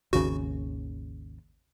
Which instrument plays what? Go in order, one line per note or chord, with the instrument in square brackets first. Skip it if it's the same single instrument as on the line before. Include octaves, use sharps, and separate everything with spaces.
[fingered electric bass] G#1 D#2 C#3 [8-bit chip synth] F#4